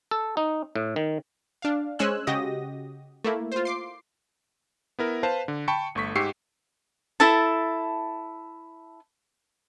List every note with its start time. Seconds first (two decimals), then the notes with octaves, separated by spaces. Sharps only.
0.11 A4
0.37 D#4
0.76 A2
0.96 D#3
1.62 D4 F5
1.99 G#3 C#4 C5 G#5 E6 F#6
2.27 C#3 F#4 G4 D#5 D#6 A#6
3.24 A3 A#3 E4
3.52 F4 C5
3.65 C6 D6 C7
4.99 B3 E4 A#4
5.23 B4 C5 F5 A5
5.48 D3
5.68 G5 A5 B5 C#6 C#7
5.95 G1 A3 C#6 B6
6.15 G#2 G4 C#6 E6 C7 C#7
7.20 E4 A4 A5